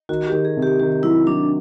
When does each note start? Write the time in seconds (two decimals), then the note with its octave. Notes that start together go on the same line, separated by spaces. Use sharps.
0.09 D#3 F#4
0.27 D#3 G4
0.45 G#4
0.57 C3
0.62 G4
0.80 D#3 G4
1.03 F#3 E4
1.26 F#3 D4